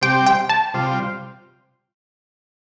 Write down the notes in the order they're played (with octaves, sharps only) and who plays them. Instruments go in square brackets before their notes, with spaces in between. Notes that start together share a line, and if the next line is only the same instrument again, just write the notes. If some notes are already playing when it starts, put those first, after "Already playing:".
[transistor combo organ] C3 G3 C4 G4 [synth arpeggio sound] G5
[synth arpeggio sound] G5
A5
[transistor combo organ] C3 G3 F4